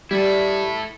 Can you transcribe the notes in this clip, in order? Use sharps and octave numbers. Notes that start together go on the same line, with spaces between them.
G3 E4 A4